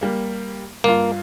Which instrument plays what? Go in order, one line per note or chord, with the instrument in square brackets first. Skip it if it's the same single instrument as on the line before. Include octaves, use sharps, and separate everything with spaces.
[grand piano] G3 A#3
[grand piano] G2 F4 [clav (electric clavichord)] A#3